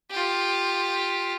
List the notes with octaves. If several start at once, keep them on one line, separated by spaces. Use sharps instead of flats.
F4 G4